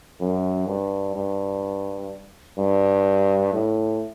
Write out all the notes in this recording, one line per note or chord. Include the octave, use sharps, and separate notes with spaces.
F#2
G2
G2
G2
A2